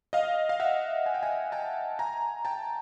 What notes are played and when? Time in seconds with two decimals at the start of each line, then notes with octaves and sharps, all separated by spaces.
0.13 D#5 F5
0.49 F5
0.60 E5 F#5
1.06 G#5
1.14 G5
1.23 F#5 G#5
1.52 G5 A5
1.99 G#5 A#5
2.45 G5 A5